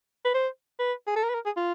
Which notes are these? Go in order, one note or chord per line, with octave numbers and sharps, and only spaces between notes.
B4
C5
B4
G#4
A4
A#4
B4
A#4
G#4
F4